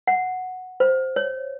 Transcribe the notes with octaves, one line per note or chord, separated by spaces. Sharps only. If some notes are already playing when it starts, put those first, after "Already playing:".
F#5
C5
C#5